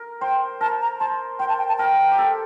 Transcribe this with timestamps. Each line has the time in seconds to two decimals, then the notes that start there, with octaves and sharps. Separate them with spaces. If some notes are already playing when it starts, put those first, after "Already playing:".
Already playing: A#4
0.21 C5 G5
0.61 A#4 A5
0.81 A#5
1.00 C5 A5
1.39 C5 G5
1.49 A5
1.59 G5
1.68 A5
1.78 A#4 G5
2.12 G4
2.18 A4